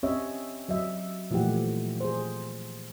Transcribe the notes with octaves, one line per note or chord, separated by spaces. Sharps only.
C4 C#4 G4 C#5 D#5 E5
F#3 D#5 E5
A#2 E3 F3 A3 G4 F#5
G#4 C5